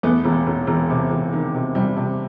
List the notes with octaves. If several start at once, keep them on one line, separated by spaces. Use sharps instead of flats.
E2 A3 B3
E1
E1
E1
C3
E1
D#3
C3
C3 G3
C3